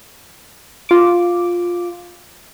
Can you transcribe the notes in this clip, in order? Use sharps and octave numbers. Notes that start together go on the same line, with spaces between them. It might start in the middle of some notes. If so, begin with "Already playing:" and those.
F4 D6